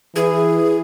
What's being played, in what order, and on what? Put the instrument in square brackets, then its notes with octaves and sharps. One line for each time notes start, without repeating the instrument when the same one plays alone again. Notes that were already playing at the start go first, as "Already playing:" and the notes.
[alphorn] E3 [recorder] G#4